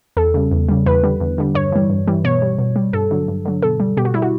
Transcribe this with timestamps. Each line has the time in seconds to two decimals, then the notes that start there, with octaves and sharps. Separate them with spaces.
0.17 E2 A4
0.34 C#3 G3
0.51 E2
0.69 C#3 G3
0.86 E2 B4
1.03 D3 G3
1.20 E2
1.38 D3 G3
1.55 G2 C#5
1.72 E3 G3
1.90 G2
2.07 E3 G3
2.24 B2 C#5
2.42 G3
2.59 B2
2.76 G3
2.93 G2 A4
3.11 D3 F#3
3.28 G2
3.45 D3 F#3
3.63 B2 A4
3.80 G3
3.97 B2 G4
4.05 F#4
4.14 G3 E4
4.22 F#4